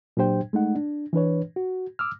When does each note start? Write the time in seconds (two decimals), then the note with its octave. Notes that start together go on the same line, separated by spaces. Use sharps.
0.17 A#2 F#3 D4 G4 C5 G5
0.53 G#3 A3 D#4 F#5
0.75 D4
1.13 E3 D4 B4 C#5
1.56 F#4
1.99 D6 E6 F6